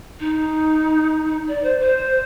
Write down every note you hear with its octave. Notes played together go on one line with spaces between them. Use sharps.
D#4
D5
C5
C5